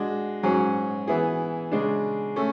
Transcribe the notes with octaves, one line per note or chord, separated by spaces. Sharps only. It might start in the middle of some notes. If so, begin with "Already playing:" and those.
Already playing: G#3 D4 F#4
G#2 F#3 C#4 G#4
E3 B3 E4 G#4
C#3 G#3 D4
A3 C#4